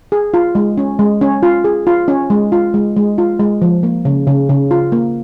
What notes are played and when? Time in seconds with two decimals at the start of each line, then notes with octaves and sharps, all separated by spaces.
0.12 G#4
0.34 F4
0.55 G#3
0.78 C#4
0.99 G#3
1.21 C#4
1.43 F4
1.64 G#4
1.87 F4
2.08 C#4
2.30 G#3
2.52 F4
2.74 G#3
2.97 G#3
3.18 F4
3.40 G#3
3.62 F3
3.83 A#3
4.05 C#3
4.27 C#3
4.49 C#3
4.71 F4
4.92 A#3